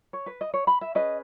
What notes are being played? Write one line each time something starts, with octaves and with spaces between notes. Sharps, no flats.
C#5
B4
D#5
C#5
B5
E5
C#4 G#4 B4 D#5